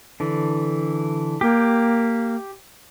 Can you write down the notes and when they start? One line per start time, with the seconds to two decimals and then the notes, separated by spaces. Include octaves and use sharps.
0.20 D3 E3
1.41 A#3 G4 G5